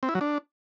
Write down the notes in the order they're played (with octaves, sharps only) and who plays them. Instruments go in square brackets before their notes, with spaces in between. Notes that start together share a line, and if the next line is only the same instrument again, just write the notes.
[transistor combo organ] C4
E4
F#3
D4